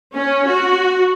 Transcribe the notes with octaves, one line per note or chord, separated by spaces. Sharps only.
C#4
F#4